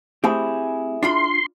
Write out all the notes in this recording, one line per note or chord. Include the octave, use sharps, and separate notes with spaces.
A3 C4 E4 G4 G#4
D4 F4 B5 C6